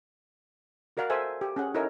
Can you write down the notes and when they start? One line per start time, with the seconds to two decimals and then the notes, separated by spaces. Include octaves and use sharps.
0.97 F#4 A#4 D5 F5 F#5
1.10 A4 C5 E5 G#5
1.41 G4
1.56 C#4 G#4 F#5
1.74 D#4 E4 A4 A#4 C#5 D#5